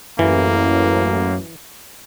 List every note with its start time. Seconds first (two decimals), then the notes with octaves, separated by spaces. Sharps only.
0.19 A1 F#2 E3 A#3